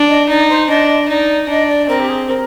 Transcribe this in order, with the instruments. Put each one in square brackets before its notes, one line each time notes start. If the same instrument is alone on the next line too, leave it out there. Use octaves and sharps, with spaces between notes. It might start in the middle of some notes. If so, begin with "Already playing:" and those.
Already playing: [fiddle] D4
[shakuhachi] D#5
[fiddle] D#4 [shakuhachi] D5
[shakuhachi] C5
[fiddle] D4 [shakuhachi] D#5
[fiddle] D#4 [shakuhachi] D5
[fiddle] D4 [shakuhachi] D#5
[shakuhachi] D5
[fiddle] C4 [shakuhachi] A#4
[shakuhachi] G4
G#4
A#4